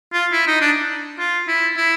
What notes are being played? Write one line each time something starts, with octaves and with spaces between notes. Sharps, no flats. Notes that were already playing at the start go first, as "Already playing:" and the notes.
F4
E4
D#4
D4
F4
E4
E4